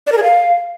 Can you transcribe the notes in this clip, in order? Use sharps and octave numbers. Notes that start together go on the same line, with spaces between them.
D5
A#4
G#4
F5